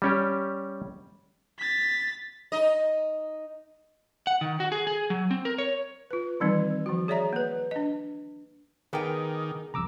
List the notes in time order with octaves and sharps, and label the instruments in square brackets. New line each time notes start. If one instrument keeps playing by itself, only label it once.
[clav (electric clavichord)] G3 C#4 G4
[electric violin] A6 B6
[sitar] D#4 D#5
[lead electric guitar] F#5
D#3
F#4
G#4
G#4
F#3
C4
A#4
C#5
[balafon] F4 B4
D#3 E3 G3 C4 D#4
F3 F#4
G#4 C#5 D5 E5 A#5
A#3 B4
D4 D#5
[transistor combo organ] D#3 [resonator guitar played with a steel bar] B3 G5 [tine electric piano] G#4 A#4 [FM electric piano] B4 D6 D#6
[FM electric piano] C2 F2 [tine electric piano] A#5 D6 E6